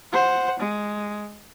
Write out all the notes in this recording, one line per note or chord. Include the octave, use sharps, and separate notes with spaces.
C5 F#5
G#3